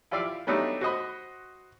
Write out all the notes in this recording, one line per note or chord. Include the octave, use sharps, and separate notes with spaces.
E4 F4 G4 D5 E5 F5
F#3 G3 A3 B3 D4 D#4
F#4 C5 D#5 B5